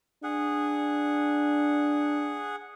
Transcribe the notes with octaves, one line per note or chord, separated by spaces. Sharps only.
D4 G#4 F#5